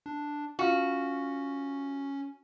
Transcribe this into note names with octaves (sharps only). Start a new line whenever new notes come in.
D4
C#4 F4 F#4 F5 F6